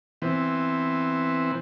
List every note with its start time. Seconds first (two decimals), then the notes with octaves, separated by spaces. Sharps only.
0.22 E3 B3 C4